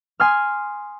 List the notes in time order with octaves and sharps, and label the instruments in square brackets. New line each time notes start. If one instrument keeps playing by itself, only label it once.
[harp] G#5 C6 D#6 F6